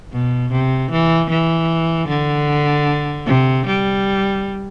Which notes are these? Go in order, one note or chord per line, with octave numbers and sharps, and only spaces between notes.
B2
C3
E3
E3
D3
C3
G3